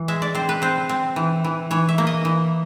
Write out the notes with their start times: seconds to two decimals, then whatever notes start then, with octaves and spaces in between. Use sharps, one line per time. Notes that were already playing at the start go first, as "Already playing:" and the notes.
Already playing: E3
0.08 G#3 E5
0.22 D5
0.35 C4 C5
0.49 B4
0.62 C4 C5
0.89 C4
1.16 E3
1.44 E3
1.71 E3 C#5
1.89 E5
1.98 A#3
2.07 D#5
2.25 E3